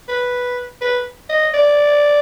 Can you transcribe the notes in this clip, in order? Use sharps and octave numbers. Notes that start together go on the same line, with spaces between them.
B4
B4
D#5
D5